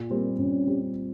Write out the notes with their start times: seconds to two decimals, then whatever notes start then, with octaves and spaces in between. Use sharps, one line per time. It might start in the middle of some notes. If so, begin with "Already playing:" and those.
Already playing: A#2
0.10 G3 A#3 C4 G4
0.39 A#2 C#4
0.67 G3 C4 G4